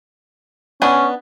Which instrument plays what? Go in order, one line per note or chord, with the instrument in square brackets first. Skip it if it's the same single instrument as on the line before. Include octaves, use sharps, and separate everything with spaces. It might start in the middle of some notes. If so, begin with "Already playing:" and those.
[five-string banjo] B3 D4 G#5 [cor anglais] C#4